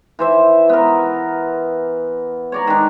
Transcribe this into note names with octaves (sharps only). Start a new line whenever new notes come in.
E3 C5 E5
B3 A#4
C#5 D5 A#5
D#3 G#3 D4